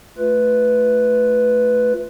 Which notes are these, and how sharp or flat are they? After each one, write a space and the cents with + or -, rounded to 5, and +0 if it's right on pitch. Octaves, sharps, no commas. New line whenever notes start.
A3 +0 F4 +0 B4 +0